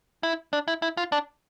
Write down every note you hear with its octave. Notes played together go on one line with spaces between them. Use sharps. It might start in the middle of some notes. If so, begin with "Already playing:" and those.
E4
D4
E4
E4
F4
D4